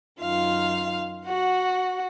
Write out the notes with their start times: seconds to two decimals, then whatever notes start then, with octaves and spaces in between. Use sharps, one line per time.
0.21 F#2 D#3 F4 F5
1.27 F#4 F#5